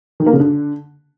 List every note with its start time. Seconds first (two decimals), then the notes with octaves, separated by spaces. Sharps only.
0.20 D#3
0.26 A#3
0.33 C#3
0.40 D3